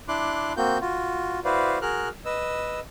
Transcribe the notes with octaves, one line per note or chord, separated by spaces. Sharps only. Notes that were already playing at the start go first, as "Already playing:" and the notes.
D4 E4 C6 D6 F#6
A#3 C4 F#4 G6
F4 F#4
E4 F#4 B4 C5 D5 F5
F#4 G#4 A#4 F6 F#6
B4 D#5 E6